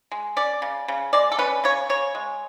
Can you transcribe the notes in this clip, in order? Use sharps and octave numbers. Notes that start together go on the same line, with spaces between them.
G#3
C#4 D5
C#3
C#3
G#3 D5
A4
C#4 B4
C#3 C#5
C#3 C#5
G#3